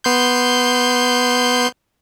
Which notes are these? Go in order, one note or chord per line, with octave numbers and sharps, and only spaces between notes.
B3 C6 G6